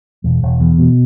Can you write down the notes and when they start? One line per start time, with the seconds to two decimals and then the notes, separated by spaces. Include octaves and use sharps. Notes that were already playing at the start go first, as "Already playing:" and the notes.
0.24 E1
0.43 E1
0.60 E2
0.79 B2